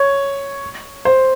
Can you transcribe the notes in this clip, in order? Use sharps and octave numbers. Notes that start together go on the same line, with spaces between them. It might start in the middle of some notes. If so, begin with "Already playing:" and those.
Already playing: C#5
C5